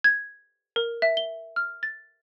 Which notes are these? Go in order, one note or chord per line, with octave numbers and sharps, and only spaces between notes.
G#6
A#4
E5
G7
F6
A6